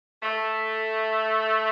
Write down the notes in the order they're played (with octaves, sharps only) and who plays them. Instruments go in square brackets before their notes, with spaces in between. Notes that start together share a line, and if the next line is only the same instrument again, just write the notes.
[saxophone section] A3